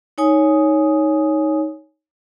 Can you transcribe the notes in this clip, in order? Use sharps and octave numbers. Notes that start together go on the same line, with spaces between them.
D#4 C#5 G#5 D#6